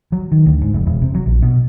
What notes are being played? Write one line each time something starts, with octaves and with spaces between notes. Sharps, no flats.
F#3
D#3
D2
G#2
F1
E1
C3
F#3
A#1
B2